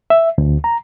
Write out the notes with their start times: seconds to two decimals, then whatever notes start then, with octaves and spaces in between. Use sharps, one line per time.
0.10 E5
0.38 D2
0.64 A#5